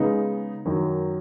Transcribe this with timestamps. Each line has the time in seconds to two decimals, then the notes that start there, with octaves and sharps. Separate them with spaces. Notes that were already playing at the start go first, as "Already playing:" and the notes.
Already playing: C#3 G#3 B3 D#4
0.66 F#2 D#3 F#3